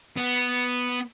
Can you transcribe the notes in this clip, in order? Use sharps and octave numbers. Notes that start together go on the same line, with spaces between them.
B3